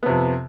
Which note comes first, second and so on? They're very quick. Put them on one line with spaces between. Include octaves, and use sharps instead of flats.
B3 C3 F2